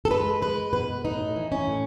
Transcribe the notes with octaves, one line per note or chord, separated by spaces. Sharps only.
A4
G#3 B4
G#3 B4
B2 B4
A2 D#4
E3
C#4
A2